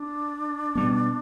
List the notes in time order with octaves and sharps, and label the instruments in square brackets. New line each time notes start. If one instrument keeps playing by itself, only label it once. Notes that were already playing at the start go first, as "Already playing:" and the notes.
Already playing: [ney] D4
[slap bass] B2 G3 B3